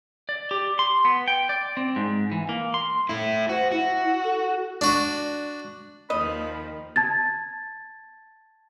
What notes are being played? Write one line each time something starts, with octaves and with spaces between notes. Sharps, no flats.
D5
G4
C6
B3
G5
D5
C4
G#2
E3
A#3
C6
A3 E4
F#4 C5
E4 F#4
A4
D4 F#4
D#2 D#3 F3 D#5 B5
A5 G#6 A6